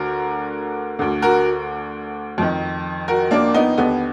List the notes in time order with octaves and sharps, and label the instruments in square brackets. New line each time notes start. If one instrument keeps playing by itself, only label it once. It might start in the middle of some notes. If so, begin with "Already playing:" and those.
Already playing: [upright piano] D2 D3 F#4 A#4
D2 D3
F#4 A#4
F2 D#3
F#4 A#4
A#3 D4
B3 D#4
D#2 D3 B3